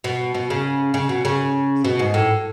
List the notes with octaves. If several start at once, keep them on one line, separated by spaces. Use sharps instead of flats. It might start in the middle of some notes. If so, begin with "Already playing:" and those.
B2
B2
C#3
C#3
B2
C#3
B2
G#2
A2